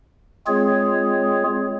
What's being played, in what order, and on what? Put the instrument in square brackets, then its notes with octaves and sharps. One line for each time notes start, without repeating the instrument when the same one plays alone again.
[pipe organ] G#3 C4 F4 G#4 C#5